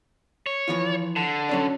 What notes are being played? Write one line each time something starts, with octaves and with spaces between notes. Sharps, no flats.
C#5
E3 F3 F4
D3
F#3 C#4 D5